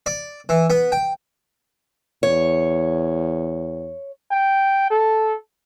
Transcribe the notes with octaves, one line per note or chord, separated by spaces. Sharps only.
D5
E3
B3
G5
E2 C#5
G5
A4